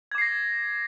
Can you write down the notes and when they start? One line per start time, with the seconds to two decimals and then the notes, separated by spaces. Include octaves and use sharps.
0.12 G#6
0.15 D6
0.18 C7
0.21 A#6